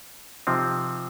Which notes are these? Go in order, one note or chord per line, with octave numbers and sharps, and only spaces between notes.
C3 F3 C4 D#4